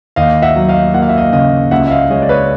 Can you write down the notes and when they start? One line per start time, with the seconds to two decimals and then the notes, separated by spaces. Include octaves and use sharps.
0.16 D#2 D#5 F5
0.42 E5 F#5
0.56 F#3
0.68 D#5 F5
0.94 A#3 F#5
1.02 F5
1.09 E5
1.17 D#5 F5
1.33 C#3 D#5 F5
1.71 C#2 E5 F#5
1.87 E5
1.91 D#5 F5
2.10 G#3 C#5 D#5
2.22 D5
2.29 B4 C#5